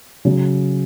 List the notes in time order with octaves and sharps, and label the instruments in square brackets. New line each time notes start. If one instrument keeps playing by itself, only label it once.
[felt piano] C#3 F#3